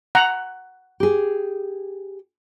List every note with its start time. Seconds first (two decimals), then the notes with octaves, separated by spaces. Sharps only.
0.15 F#5 A#5
1.00 G4 G#4